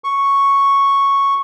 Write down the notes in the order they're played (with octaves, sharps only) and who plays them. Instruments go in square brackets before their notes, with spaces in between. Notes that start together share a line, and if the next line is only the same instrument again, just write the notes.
[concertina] C#6